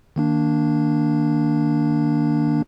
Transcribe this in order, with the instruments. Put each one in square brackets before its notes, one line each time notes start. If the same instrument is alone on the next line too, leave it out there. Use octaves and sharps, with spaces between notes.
[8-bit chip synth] D#3 A#3 D4